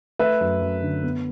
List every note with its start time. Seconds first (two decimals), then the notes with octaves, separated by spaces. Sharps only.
0.19 A3 B4 E5
0.41 F#2
0.62 F#2
0.82 D3
1.04 B3